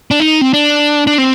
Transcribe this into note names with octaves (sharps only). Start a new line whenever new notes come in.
D4
D#4
C4
D4
D4
C4